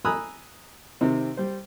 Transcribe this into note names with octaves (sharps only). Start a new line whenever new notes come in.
G#5 A#5 B5 D#6 E6 F#6
C3 D#3 C4
G3 C5